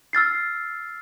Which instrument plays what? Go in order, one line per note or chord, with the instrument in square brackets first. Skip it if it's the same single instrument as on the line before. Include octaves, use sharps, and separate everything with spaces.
[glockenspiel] E6 F6 A6 C7